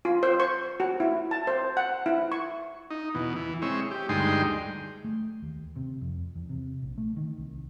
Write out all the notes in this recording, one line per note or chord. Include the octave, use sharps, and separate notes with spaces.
F4
C5
C#6
F#4
E4
A5
C5
F#5
E4
C#6
D#4
E2 B2
E3
G#3 C4 C#5 E5
G4
D2 G2 G#3 D#4 G5 C6
A3
D#2
C3
F2
E2
C3
A#1
A3
D#3
C2